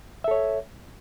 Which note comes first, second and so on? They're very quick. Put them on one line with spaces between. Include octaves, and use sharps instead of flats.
E5 A4 C#5